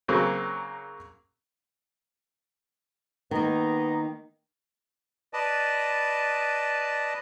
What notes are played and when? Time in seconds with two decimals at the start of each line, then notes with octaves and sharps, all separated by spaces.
0.08 C#3 F#3 A#3 C4
3.31 D#3 A#3 B3 D#5 A#5
5.33 B4 D5 D#5 A5